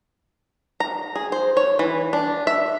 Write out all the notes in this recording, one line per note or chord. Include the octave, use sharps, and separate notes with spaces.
A#5
G#4
C5
C#5
E3
D4
E5